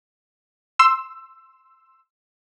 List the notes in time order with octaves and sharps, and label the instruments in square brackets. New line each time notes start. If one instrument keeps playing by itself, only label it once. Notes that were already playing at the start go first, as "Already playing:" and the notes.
[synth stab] C6 E6